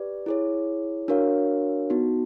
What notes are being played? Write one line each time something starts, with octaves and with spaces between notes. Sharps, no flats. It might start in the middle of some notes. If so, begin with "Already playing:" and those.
Already playing: G4 B4 D5
E4 G#4 C#5
D4 F#4 A#4 C#5 F5
B3 D#4 F#4